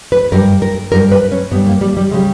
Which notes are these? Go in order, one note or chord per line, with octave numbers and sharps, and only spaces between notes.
B4
G2 G3 A#4
A#4
G2 G3 A#4
B4
C#4
G2 G3 B3
A#3
G3
G3
C#3 G3 G#3